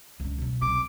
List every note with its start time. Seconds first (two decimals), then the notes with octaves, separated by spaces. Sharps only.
0.20 C#2 D3
0.38 B2 F#3
0.61 C2 D6